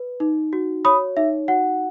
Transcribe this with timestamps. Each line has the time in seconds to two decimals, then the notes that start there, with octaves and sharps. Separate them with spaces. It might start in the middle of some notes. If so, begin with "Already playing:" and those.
Already playing: B4
0.20 D#4
0.53 F#4
0.85 C#5 B5 D#6
1.17 D#4 E5
1.48 F#4 F#5